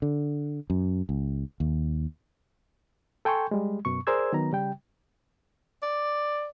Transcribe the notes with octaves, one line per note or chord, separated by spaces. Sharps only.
D3
F#2
C#2
D#2
A4 G5 G#5 C6 C#6 G6
G3 G#3
F#2 B2 C#6
G#4 A#4 C5 D5 E6 G#6
D#3 F#3 B3 A#5
C#3 G3 G5
D5